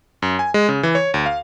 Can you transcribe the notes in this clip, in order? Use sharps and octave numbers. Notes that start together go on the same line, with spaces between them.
F#2
G#5
G#3
C#3
E3
C#5
D2
F5